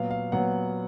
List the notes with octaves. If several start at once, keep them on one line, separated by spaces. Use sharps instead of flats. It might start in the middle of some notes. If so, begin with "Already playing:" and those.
Already playing: A#2 F#3 B3 F5
F5
A#2 F#3 B3 F#5